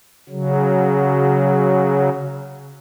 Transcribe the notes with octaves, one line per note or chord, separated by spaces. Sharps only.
C#3 F#3